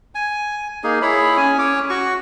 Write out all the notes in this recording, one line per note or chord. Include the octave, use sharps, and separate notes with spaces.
G#5
A#3 D#4 G#4
E4 G#4 C#5 B5
C#4 G#5
C#4 C#5 D6
F#4 C#6